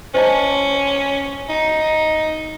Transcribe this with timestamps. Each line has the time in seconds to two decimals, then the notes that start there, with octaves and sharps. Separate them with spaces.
0.14 C#4 C5 D#5 A5
1.49 D#4